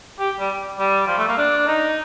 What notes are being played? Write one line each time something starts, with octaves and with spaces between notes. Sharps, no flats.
G4
G3
G3
F3
A3
A#3
D4
D#4